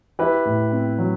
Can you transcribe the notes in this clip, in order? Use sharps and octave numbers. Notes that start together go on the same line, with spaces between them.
E4 G4 B4
A2
C4
F#3